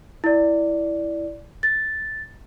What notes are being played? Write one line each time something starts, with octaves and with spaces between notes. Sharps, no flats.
E4 D5
A6